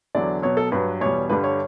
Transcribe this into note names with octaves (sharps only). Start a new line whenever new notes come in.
E2 D3 F#3 D5
B2 F#3 C#5
A4
G2 F#3 B4
E2 B2 G3 C#5
G2 D3 G3 B4
C#5